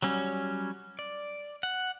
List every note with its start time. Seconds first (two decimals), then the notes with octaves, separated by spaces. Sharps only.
0.02 F#3 G3 C#4
0.99 D5
1.63 F#5